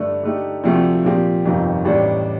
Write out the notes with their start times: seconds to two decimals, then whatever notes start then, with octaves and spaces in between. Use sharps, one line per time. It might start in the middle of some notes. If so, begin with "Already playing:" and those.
Already playing: G2 D3 A3
0.23 D3 A3 D#4 G4
0.64 D2 C3 F3 A3 C4
1.05 A#2 F3 C4 G4
1.45 G1 F2 C3 D#3
1.85 A1 A2 G3 D4